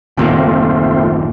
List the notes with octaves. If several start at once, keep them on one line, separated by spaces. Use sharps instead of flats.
F#1 D#2 A#2 A3 C4 F4